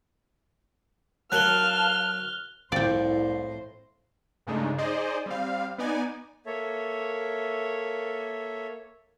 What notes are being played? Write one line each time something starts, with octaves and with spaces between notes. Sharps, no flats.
F#3 A#4 F5 A5 F6 F#6 G7
C2 F2 A2 C5 D5 G5
G2 C#3 G#3 A3 D4 D#4
D#4 G#4 C5 D5 D#5
G3 C4 F5
B3 D#4 D5 G#5
A#3 A4 C#5 E5